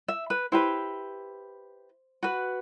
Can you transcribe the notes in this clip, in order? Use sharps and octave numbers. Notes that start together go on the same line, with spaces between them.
E5
B4
E4 G4 B4 C5
F#4 B4